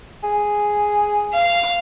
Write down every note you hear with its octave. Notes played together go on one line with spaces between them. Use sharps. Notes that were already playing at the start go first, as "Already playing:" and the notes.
G#4
F5